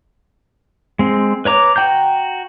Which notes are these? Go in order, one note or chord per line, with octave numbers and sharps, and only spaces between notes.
G#3 C4
B4 C#5 A#5 D6
F#4 G5 A#5 G6